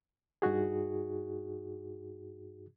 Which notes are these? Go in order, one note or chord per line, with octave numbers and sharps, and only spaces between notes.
G2 D#4 F#4 G#4